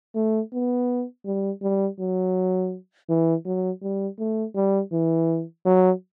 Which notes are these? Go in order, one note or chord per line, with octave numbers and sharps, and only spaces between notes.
A3
B3
G3
G3
F#3
E3
F#3
G3
A3
G3
E3
F#3